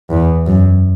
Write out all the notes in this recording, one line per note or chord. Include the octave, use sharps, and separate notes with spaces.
E2
F#2